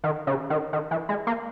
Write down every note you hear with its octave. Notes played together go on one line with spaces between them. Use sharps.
D#3
C#3
D#3
D#3
E3
G#3
A#3